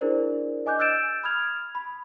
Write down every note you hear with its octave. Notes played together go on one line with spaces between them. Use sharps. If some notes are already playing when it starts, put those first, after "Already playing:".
D4 E4 G#4 A#4 C5 D5
D#5 G#5 D6 F#6 G6
E6 F#6 G6 A6 D7 E7
B5 D#6 F6 G#6 F7
B5